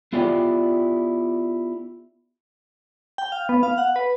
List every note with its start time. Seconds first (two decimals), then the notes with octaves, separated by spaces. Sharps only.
0.13 B3 E4 F4 G4 D5 G5
3.18 G5
3.32 F5
3.49 B3
3.63 F5
3.78 F#5
3.96 B4